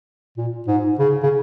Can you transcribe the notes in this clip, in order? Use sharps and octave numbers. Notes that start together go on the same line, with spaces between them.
A#2
G#2
C#3
C#3